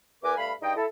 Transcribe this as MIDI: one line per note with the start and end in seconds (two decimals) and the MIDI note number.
0.23 0.34 40
0.23 0.34 59
0.23 0.34 70
0.23 0.34 71
0.23 0.34 80
0.23 0.34 86
0.37 0.52 43
0.37 0.52 57
0.37 0.52 77
0.37 0.52 83
0.62 0.73 43
0.62 0.73 63
0.62 0.73 68
0.62 0.73 75
0.62 0.73 79
0.76 0.86 64
0.76 0.86 69